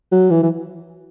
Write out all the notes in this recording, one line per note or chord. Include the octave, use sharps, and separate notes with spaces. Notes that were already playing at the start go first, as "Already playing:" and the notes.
F#3
E3
E3